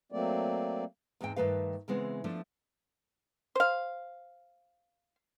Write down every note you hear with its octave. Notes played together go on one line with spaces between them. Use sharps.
F#3 A3 A#3 C4 D5
E2 G#2 G#3 C4 G5
G2 D#3 A3 B4 F5
C#3 E3 G#3 B3 C4
F3 A3 D4
C5 F5